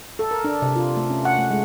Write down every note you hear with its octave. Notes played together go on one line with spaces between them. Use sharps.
A4
A#4
D4
C3
F4
A3
C#4
F#5
A3
G#3